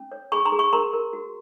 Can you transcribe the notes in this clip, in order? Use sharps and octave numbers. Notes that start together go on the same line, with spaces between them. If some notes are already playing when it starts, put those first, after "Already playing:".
Already playing: C#4
C#5
G#4 B5 C#6
A#5 C6
G#4
B5 C#6
A#4 A#5 C6
A#4
F#4